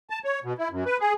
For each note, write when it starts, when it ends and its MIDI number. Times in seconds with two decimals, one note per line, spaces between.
0.10 0.19 81
0.24 0.39 73
0.44 0.53 47
0.58 0.68 64
0.71 0.84 42
0.86 0.97 71
1.00 1.13 68